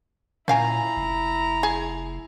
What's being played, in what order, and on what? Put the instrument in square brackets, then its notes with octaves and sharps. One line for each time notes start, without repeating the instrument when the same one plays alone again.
[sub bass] A#2 [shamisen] C#4 F5 G#5 [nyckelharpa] E4 A#5
[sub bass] F1
[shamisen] G#4